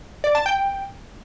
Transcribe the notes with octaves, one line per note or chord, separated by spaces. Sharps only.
D5
A5
G5